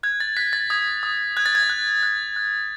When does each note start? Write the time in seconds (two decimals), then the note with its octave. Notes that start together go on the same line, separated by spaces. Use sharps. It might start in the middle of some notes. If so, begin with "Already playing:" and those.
0.03 F#6 G#6
0.20 A6
0.37 F#6 B6
0.53 A6
0.70 D#6 G#6
1.03 D#6
1.37 F#6 G#6
1.46 A6
1.55 G#6
1.70 F#6
2.03 F#6
2.36 F#6